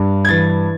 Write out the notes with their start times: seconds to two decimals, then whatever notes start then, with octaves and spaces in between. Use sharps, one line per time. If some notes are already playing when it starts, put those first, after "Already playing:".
Already playing: G2
0.25 G#6
0.29 E3 A6